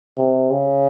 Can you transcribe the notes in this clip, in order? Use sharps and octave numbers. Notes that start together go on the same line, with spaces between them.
C3
C#3